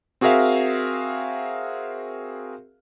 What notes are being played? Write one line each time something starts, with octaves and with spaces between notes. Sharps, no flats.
C4 F#4 G#4 A#4 E5 F5